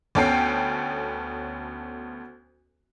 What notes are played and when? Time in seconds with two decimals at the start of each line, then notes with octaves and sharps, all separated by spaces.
0.15 D2 B3 C#4 A4 G5 C7